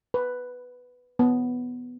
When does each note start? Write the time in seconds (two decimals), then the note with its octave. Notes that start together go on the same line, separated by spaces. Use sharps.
0.14 B4
1.19 B3